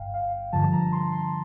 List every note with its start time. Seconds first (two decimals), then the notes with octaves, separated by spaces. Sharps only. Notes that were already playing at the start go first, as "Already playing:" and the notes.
Already playing: G1 G2 F5 G5
0.14 F5
0.53 G2 D3 F3 A5
0.73 A#5
0.92 C6
1.12 C6